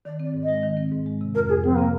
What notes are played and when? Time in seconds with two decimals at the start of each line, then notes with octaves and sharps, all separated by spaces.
0.05 D#3 D5
0.20 C4 D5
0.34 G#2
0.43 D#5
0.48 G#3
0.63 D#3
0.77 C4
0.91 G#2
1.06 G#3
1.21 C3
1.34 F2 A#4
1.49 F2 G#4
1.64 F3 C4
1.75 C3 A#3